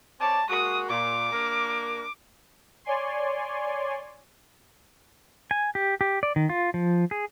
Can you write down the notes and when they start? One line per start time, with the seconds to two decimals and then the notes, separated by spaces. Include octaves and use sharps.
0.20 C4 C#5 D5 A5
0.50 G#3 A#3 F#4 D#6
0.89 A#2 D6
1.32 A#3 D4 A#4
2.84 C#5 D5 G#5 C6
5.51 G#5
5.75 G4
6.01 G4
6.23 D5
6.36 D#3
6.49 F4
6.74 F3
7.11 G#4